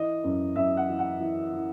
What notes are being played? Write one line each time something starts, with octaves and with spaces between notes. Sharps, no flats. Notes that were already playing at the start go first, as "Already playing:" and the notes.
Already playing: E3 D#5
F#2
F#2 E5
F#5
E3
F#5
E3
E3